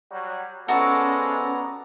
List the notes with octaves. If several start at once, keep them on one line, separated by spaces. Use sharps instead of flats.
F#3 G3 F#4
F3 G#3 B3 C#4 F#4 A4 D5 A#5